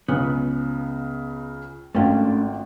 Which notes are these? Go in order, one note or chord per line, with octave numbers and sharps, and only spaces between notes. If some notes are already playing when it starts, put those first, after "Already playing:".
C#2 C#3 B3
G#1 A3 C#4 D4 F4 G5